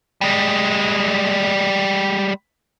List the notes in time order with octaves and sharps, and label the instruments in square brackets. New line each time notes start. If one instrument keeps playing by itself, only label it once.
[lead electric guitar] G3 G#3